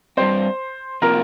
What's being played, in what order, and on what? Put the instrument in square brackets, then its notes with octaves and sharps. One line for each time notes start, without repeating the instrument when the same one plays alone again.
[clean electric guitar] G2 G3 C4 [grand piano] C5 C6
[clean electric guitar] C3 F3 A#3 F4 [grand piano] A#4 A#5